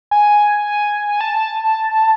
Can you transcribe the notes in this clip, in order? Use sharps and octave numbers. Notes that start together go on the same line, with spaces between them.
G#5
A5